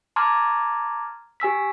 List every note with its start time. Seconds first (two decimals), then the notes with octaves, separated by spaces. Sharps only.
0.16 A5 A#5 C6 D6 F6 G#6
1.40 G4 G#5 E6 B6